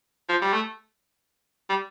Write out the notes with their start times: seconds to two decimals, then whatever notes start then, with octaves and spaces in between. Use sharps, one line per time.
0.29 F3
0.42 G3
0.53 A3
1.70 G3